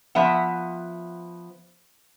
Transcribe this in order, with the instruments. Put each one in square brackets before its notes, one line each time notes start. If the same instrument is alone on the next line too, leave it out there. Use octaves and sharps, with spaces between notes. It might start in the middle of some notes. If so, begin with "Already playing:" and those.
[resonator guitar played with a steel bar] F3 B3 E5 F#5